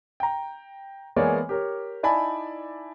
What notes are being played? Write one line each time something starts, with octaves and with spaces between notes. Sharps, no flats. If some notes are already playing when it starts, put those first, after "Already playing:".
G5 A#5
E3 G#3 A#3 B3 C#5 D5
G4 A#4 C#5
D#4 E4 D5 G#5 A5 B5